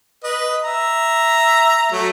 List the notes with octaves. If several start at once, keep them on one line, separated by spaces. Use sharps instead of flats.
B4 D#5
E5 A#5
F#3 A3